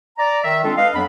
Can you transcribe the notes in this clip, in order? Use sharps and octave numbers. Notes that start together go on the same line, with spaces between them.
D5 A#5
D#3 E5
G#3 C4 D4 F4 A4
A4 B4 D#5 F5
F2 F#3 B3 D4 B5